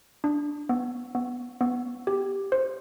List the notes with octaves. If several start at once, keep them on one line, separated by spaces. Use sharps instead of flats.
D4
B3
B3
B3
G4
C5